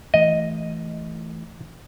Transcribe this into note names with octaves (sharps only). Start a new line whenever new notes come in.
E3 A3 D#5